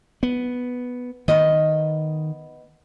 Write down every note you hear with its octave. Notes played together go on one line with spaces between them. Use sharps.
B3
D#3 B3 D#5